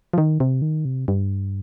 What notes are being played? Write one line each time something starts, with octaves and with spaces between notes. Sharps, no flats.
F3
D#3
C3
D#3
C3
G2